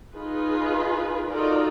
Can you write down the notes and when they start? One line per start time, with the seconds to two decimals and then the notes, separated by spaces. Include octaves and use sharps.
0.14 D#4 F4 G#4 B4
1.29 D#4 F4 F#4 A4 A#4 D5